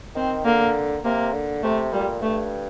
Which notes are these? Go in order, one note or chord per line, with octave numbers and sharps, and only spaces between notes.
D#3 C4
D3 A#3
C3 A#3
D3
C3 A3
A#2 G3
G2 A3